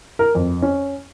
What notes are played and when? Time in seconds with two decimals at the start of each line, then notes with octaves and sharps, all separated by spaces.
0.19 A#4
0.35 F2
0.62 C#4